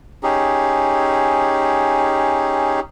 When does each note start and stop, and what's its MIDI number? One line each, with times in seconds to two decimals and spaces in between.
0.23 2.80 61
0.23 2.80 63
0.23 2.80 67
0.23 2.80 68